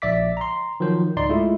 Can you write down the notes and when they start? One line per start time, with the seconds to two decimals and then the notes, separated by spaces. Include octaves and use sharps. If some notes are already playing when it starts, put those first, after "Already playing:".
0.02 A#1 D5 E5 D6 B6
0.37 A#5 C6
0.80 D#3 F3 F#3 C5
1.16 C#2 G#2 D#4 D5 C6
1.29 G#3 A3 E4 F4